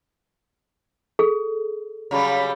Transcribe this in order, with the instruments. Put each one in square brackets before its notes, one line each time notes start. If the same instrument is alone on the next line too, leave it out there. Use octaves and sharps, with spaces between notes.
[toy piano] G#4 A4
[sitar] C#3 F#3 G3